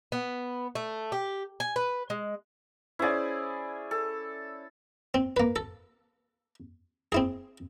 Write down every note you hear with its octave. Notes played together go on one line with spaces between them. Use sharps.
B3
A3
G4
G#5
B4
G#3
C#4 E4 G#4 C5 D5
A4
C4
A#3 B4
A4
C4 E4 G#4